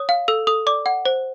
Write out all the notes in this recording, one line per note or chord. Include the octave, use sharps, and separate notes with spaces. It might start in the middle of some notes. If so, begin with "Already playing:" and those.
Already playing: C#5 D#6
F5
A4 E6
A4 D#6
D5 D6
F#5
C5